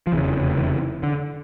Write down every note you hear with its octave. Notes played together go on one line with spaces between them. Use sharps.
F3
F1 E2 C#3 E3
E3
D3